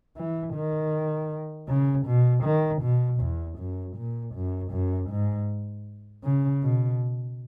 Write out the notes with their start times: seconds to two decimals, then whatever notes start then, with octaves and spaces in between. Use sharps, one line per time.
0.17 E3
0.54 D#3
1.68 C#3
2.06 B2
2.44 D#3
2.82 B2
3.21 E2
3.59 F#2
3.97 A#2
4.35 F#2
4.72 F#2
5.10 G#2
6.24 C#3
6.63 B2